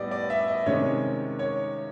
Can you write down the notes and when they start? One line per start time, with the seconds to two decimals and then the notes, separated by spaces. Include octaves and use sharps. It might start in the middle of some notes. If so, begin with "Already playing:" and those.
Already playing: A2 E3 G3 B3 D5 D#5
0.11 D5
0.30 E5
0.48 D#5
0.66 C3 D#3 G#3 C#4 C#5
1.39 C#5